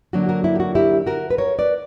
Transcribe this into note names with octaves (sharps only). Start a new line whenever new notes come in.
D3 F#3 A#3 D4 F#4
F#4 A#4
E4
G4
F#4
E4 G4
F#4 A#4
B4
A#4 C#5
B4 D5